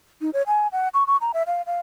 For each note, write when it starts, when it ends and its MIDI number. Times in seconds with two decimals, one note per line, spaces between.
0.21 0.30 63
0.33 0.43 73
0.47 0.68 80
0.72 0.88 78
0.94 1.04 85
1.07 1.17 85
1.21 1.32 82
1.34 1.43 76
1.47 1.62 77
1.66 1.80 77